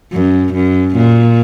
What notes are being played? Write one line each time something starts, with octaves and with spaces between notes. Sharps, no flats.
F#2
F#2
A#2